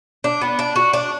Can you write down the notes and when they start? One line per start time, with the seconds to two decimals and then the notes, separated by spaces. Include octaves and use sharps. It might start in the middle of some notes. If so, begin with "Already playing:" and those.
0.24 D4
0.41 B3
0.59 D4
0.76 F#4
0.93 D4